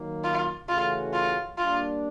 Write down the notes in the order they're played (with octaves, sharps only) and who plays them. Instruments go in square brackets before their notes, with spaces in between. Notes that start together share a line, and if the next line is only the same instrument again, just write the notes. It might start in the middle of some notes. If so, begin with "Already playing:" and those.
Already playing: [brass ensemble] D#3 F#3 A#3
[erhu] F4
[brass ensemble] C#3 E3 A3 C#4 F#4 [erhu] F4
[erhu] F4
[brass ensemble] G3 A#3 D4 [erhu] F4